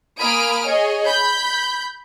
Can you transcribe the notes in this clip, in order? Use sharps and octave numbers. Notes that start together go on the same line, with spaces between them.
A#3 G#5 B5 D#6 F6 D7
G#4 C#5 D#5
B5 G6